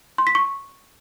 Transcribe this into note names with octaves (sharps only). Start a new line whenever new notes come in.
C6
B6
C#6